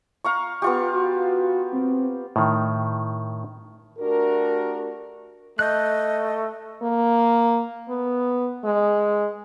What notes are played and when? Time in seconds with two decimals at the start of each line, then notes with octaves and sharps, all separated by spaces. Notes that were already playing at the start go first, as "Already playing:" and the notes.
0.24 F5 A#5 C#6
0.62 B3 F4 G4 C#6
0.93 F#4
1.72 C4
2.36 A2 D#3
3.99 A3 D4 F#4 G4 A#4
5.59 A3 D#5 F#6 G6
6.83 A#3
7.89 B3
8.64 G#3